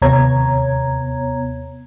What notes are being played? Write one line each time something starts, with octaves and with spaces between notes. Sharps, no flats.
D#2 C3 B3 C#5 A#5 G#6